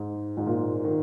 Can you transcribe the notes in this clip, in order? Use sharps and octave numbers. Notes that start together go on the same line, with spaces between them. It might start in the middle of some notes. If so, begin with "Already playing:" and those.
Already playing: G#2
G#2
A#2
D#3